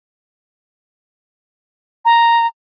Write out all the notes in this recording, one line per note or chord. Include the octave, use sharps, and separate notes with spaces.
A#5